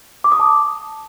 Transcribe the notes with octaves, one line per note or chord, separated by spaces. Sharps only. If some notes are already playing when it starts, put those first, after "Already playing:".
D6
D#6
A5